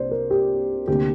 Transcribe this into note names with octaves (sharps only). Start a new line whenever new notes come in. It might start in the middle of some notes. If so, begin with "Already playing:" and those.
Already playing: C2 C3 A#3 D4 C5 D5
A#4
G4
D2 C3 A#3 D4 G4